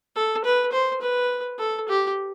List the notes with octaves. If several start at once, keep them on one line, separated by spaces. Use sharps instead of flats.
A4
B4
C5
B4
A4
G4